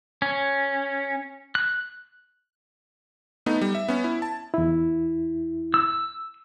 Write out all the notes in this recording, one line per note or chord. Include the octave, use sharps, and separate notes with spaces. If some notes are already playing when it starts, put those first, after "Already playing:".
C#4
F#6
A3 B3 D#4
G3
E5
B3 C#4
E4
A5
E2 E4
E6